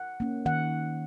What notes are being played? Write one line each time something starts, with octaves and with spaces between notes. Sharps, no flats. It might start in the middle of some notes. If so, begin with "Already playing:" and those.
Already playing: F#5
A#3 C#4
D#3 F#5